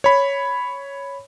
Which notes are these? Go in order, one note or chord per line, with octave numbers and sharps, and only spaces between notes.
C#5 B5